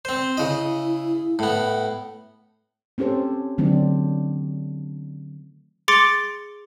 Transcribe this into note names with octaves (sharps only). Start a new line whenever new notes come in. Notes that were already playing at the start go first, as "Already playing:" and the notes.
C4 C5
C#3 E4 D#5
A2 B3
C4 C#4 G4 A4 C5
D3 D#3 F#3 A3 C4 D4
G#4 C6 D6 A6 C#7 D7